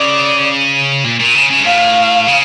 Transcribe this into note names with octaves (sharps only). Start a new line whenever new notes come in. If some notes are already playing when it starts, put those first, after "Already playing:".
Already playing: C#3 D5
A#2
A#2
C#3
C#3
G2
A2 F5
C#3